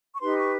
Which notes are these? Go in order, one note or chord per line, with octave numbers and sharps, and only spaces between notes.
C#6
D#4 G4 B4 C6
C#6